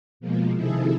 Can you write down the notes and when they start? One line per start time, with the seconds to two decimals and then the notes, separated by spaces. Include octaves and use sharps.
0.20 B2 F3 G#3 A#3
0.55 C3 D#3 F3 E4 G#4 A4